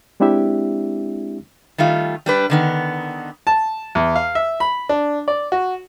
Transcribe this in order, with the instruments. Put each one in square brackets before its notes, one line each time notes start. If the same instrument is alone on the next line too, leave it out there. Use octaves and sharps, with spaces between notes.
[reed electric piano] G#3 C4 D4 E4 G4 E5
[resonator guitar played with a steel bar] D#3 G3 A3 F4
G3 D4 B4
D3 D#3 B3
[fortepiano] A5
E2
F5
E5
B5
D4
D5
F#4